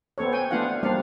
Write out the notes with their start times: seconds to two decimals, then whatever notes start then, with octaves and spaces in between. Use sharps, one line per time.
0.18 B3 C4 A4 C#5
0.32 G5 G#5
0.51 A3 B3 D4 F4 F5 F#5
0.83 G3 A#3 C4 D4 D5 F5